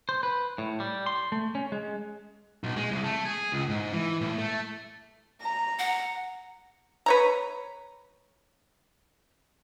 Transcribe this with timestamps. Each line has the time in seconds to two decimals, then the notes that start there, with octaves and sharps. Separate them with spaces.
0.09 C5
0.23 B4
0.58 A2
0.80 G3
1.06 C6
1.32 A3
1.55 C#4
1.72 G#3
2.64 B1
2.77 G#3
2.89 C2
3.04 A3
3.25 G#4
3.52 C#2
3.69 G#2
3.93 E3
4.21 A2
4.38 A3
5.41 A#5
5.79 F#5
7.06 B4 C#5 A#5